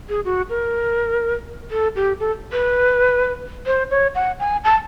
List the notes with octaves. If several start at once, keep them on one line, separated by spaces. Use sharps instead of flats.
G#4
F#4
A#4
A4
G4
A4
B4
C5
C#5
F#5
G#5
A5